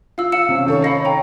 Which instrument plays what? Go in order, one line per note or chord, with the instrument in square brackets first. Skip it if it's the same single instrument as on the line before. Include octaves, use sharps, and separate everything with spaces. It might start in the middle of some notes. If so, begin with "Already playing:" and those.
[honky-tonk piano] F4 [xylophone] F5 E6
[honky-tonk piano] F5 [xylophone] E6 C#7 E7
[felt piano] C3 C#4
[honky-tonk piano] D#3 A4 C#5
[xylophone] D#5 F5 B5 [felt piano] A#6 C#7
[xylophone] G5 A#5